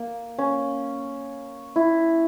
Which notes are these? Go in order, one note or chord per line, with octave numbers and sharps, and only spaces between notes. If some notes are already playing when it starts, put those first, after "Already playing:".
Already playing: A#3
C#4
E4